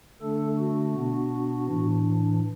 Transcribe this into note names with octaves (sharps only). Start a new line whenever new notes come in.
D3 A3 D4 A4
F#4
B2 B3 D4
A2 E3 D4